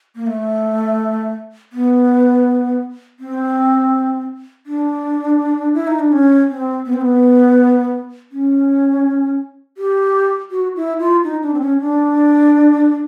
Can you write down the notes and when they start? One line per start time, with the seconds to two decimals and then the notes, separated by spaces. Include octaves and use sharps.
0.16 A#3
0.27 A3
1.73 B3
3.20 C4
4.66 D4
5.74 E4
5.87 D#4
5.99 D4
6.12 C#4
6.49 C4
6.86 B3
6.93 C4
7.01 B3
8.32 C#4
9.77 G4
10.51 F#4
10.76 E4
11.00 F4
11.24 D#4
11.43 D4
11.54 C4
11.61 C#4
11.80 D4